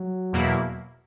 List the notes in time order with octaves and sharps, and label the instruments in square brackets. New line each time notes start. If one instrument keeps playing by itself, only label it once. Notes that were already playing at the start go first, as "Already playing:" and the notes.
Already playing: [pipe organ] F#3
[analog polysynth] E2 B2 A#3 E4